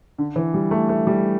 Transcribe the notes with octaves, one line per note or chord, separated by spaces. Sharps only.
D3
E3
G3
A3
A3
G3